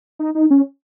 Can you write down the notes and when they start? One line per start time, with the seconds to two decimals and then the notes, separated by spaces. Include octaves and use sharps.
0.19 D#4
0.35 D#4
0.50 C#4